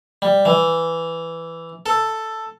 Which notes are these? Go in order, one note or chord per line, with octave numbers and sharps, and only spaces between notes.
G3
E3
A4